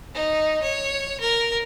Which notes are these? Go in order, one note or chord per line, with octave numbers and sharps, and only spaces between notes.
D#4
C#5
A#4